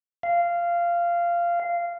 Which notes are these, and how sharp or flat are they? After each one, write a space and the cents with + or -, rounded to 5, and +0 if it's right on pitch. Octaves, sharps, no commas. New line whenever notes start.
F5 -15